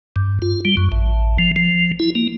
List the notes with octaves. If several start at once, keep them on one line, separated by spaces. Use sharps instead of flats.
G2
F4
G3
F#2
A1
F3
F3
E4
A#3